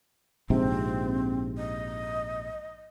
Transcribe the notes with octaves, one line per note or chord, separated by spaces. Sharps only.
A#1 G#2 C3 C4
D#5